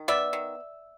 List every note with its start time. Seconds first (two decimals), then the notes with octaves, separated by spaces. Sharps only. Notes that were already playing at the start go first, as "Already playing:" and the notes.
Already playing: D#3
0.08 B3 D5 E5
0.33 D#3